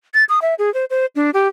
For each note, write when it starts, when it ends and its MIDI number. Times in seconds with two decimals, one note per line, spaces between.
0.14 0.24 93
0.29 0.39 87
0.42 0.54 76
0.59 0.72 68
0.74 0.85 72
0.90 1.06 72
1.16 1.31 62
1.34 1.48 67